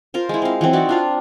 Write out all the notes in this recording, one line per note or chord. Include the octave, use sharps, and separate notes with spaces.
F4 A#4 C5
G#3 E4
C4 F5
E3 F#3 C4
D#4 E4 F#4 D5
D4 F4 F5